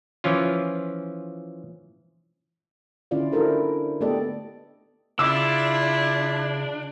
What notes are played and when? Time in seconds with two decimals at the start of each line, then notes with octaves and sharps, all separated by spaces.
0.24 E3 F3 C#4 F4
3.11 D3 C#4 E4 F4 D5 F5
3.32 D4 E4 F#4 A4 A#4 C5
4.01 A3 B3 G4 A4 D5 D#5
5.19 C#3 D4 E4 F4 D6 E6